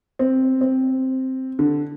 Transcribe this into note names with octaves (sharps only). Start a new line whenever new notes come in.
C4
C4
D3